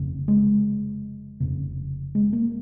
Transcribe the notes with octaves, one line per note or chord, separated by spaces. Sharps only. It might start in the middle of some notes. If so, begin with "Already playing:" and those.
Already playing: F1 F2 C#3
G#3
F1 F2 C#3
G#3
A#3